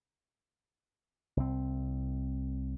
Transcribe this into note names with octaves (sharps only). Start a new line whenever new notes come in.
C2 C4